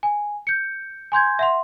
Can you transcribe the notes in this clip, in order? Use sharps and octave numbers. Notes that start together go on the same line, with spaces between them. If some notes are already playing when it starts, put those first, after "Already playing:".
G#5
G6 C#7
G#5 C6 G6 G#6
E5 F#5 C6